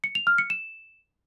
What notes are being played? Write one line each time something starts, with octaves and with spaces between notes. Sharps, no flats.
C#7
F7
F6
C#7
E7